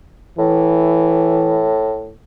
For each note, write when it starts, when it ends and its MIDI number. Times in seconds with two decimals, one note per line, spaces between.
0.39 2.16 45
0.39 1.75 52